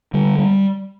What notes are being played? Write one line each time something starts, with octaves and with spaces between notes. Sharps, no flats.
D3 G3
G3